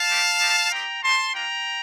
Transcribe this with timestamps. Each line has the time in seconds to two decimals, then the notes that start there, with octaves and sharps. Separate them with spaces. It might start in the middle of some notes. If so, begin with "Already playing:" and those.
Already playing: F5 A5
0.09 A3 C4 G4
0.40 A3 D#4 G4
0.72 C4 D#4 G4 G5 A#5
1.03 A#3 D#4 G4 A5 C6
1.34 A#3 D4 F4 G5 A#5